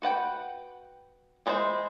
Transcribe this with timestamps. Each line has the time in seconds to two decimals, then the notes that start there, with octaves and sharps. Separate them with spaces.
0.02 F#4 B4 F#5 G5
1.46 E3 G#3 D#4 E4 C5